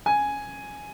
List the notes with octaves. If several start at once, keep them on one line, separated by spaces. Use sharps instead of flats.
G#5